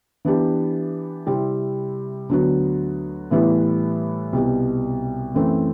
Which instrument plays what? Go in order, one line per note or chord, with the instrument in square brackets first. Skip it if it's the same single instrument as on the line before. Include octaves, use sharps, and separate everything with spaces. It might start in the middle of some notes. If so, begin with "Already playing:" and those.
[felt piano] E3 B3 D4 G4
C3 G3 C4 E4
D2 D3 F#3 B3 F#4
A2 E3 G3 B3 E4
C2 B2 G3
F#2 E3 A3 C4